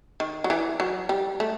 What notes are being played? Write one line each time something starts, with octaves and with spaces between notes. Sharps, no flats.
D#3
F#3
E3
F#3
G3
A3